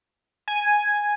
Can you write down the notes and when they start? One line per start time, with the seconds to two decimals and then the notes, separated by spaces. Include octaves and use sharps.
0.48 G#5